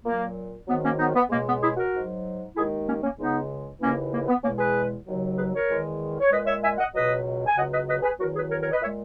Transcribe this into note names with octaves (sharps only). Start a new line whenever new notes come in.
A#2 F#3 A#3
G#2 D#3 F#3 B3
A#3 C#4
B3 D#4
B3
C#2 B2 G#3 A#3
B3
E4 G#4
F#4 A#4
G#2 F#3
D#2 D#3 G#3 E4 G#4
A#3 C#4
A#3 C#4
C#2 C#3 G#3 B3 D#4
D#2 C#3 E3 A#3 C#4
A#3
B3
E2 B2 G#3 A#3 C#4
G#4 B4
D#2 C#3 F#3
G#4 B4
A#4 C#5
E2 D#3 G#3
C#5
A#2 G#3 B4 D#5
C#5 E5
E5 G#5
D#5 F#5
C#2 B2 F#3 B4 D#5
G#5
C#2 C#3 F#3 D#5 F#5
B4 D#5
B4 D#5
G#4 B4
E2 D#3 F#3 F#4 A#4
G#4 B4
A#4 C#5
A#4 C#5
B4 D#5
A#2 G#3 C#5 E5